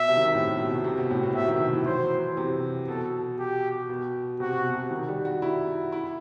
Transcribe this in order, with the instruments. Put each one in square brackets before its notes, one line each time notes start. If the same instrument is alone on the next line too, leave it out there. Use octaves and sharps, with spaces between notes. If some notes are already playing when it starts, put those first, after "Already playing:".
Already playing: [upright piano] B2 [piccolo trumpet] E5
[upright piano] C3
D#3
C3
A2
C3
B2
C3
B2
A2
B2
[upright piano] C3 [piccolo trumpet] E5
[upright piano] D#3
C3
E3
[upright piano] F#3 [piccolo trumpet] C5
[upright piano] E3
C3
[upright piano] B2 [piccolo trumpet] A4
[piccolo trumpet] G4
[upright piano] B2
[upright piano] C3 [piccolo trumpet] F#4
[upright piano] B2
C3
D#3
G3
F#4
E4
E4